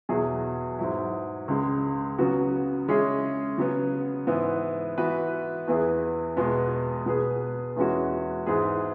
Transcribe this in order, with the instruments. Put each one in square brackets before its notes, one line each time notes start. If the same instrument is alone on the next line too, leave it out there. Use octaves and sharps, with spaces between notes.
[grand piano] E2 B2 F#3 E4 G#4
G#2 F#3 E4
C#2 C#3 G#3
C#3 F#3 B3 F#4
C#3 G#3 C#4 E4 G#4
C#3 F#3 B3
G#2 E3 B3
E3 B3 F#4 B4
E2 E3 B3 E4 G#4
E2 B2 G#3 B3 G#4
B2 B3 G#4 B4
E2 E3 G#3 C#4 F#4
G#2 E3 B3 G#4 B4